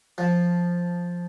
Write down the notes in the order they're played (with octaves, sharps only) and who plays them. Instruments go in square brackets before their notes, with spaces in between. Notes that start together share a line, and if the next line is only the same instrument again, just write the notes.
[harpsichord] F3